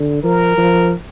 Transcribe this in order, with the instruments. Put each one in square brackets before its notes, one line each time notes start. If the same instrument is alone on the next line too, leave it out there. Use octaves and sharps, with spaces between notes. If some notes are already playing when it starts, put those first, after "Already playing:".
Already playing: [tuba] D3
[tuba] F3 [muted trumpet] A#4
[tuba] F3